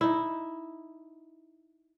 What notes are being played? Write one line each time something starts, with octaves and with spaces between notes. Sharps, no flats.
D#4 E4